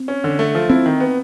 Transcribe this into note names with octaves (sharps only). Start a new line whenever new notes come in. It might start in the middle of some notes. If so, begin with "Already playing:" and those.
Already playing: C4
C#4
D3
A3
F3
C4 E4
D#3
B3